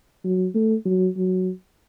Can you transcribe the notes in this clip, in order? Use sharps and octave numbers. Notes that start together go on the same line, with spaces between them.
F#3
A3
F#3
F#3